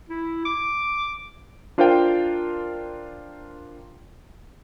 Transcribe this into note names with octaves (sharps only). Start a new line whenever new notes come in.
E4
D6
D4 F4 A#4 C5 F5 G5